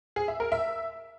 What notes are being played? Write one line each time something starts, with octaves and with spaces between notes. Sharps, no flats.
G#4
E5
A#4
E5